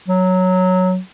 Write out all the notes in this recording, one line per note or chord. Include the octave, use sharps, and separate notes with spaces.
F#3